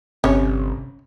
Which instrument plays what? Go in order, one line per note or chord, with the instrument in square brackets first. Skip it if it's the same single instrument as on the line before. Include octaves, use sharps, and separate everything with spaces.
[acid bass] G1 [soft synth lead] C3 [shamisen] C#4 C#5